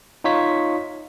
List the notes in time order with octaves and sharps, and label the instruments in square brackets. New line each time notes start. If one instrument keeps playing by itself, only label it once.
[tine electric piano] D#4 F4 C#5 B6